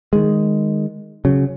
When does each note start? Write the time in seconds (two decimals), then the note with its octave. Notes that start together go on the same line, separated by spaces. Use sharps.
0.13 D#3 G#3
1.25 C#3 F#3